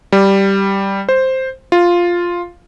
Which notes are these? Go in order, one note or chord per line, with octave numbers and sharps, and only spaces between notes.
G3
C5
F4